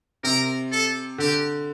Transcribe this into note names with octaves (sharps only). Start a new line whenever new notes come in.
C3 A#4
A4
D3 G4